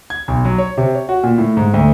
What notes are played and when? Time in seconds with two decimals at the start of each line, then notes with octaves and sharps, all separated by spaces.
0.10 G#6
0.28 B1
0.45 F#3
0.58 C#5
0.77 C3
0.95 C#5
1.09 F#4
1.23 A#2
1.38 A2
1.57 G#2
1.74 D2